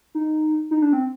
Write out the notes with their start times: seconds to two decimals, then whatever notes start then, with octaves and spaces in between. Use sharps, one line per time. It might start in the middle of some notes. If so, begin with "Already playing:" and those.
0.15 D#4
0.71 D#4
0.82 D4
0.93 C4